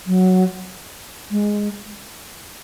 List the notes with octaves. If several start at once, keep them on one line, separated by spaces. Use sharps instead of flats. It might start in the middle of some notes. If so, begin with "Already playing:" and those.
F#3
G#3